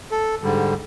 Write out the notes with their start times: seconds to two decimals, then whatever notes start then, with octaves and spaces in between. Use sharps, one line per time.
0.11 A4
0.43 G#2 D3 G3